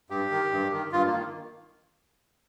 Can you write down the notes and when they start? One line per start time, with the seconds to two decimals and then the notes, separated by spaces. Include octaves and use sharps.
0.10 G2 G4
0.31 D#3
0.52 G2
0.73 D#3
0.92 G2 F4
1.06 A#3
1.13 D#3